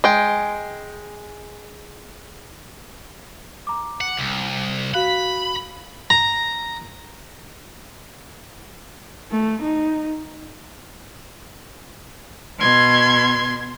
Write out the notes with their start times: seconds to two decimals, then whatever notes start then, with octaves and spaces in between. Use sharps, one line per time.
0.04 G#3 G5
3.67 A#5 D6
4.01 F#5
4.17 C2
4.94 F#4 F5 B5 F#6
6.10 A#5
9.32 A3
9.62 D#4
12.59 B2 C6 G#6